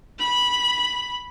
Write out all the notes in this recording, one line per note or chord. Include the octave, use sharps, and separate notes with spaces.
B5